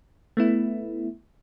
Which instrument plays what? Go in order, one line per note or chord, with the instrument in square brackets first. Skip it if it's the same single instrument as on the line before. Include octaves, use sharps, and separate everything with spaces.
[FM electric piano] A3 B3 E4